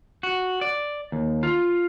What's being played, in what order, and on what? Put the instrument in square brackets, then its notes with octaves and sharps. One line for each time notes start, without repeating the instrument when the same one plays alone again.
[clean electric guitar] F#4
D5
D#2
F4